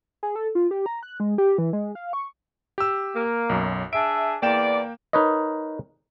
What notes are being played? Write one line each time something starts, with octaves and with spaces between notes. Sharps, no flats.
G#4
A4
F4
G4
A#5
F#6
G#3
G4
E3
G#3
F5
C#6
G4 E6
A#3
B1 F#2
D4 G#4 E5 D7
E2 A#3 D5 G5 E7
D#4 A#4 B4 C#5 D#5